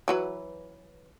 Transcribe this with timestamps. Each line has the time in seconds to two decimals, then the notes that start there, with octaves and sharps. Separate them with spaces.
0.08 E3 F#3 B4